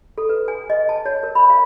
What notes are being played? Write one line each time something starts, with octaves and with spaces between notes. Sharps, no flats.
A4
B4
G#5
D#5
A5
C#5
A#4
B5
F5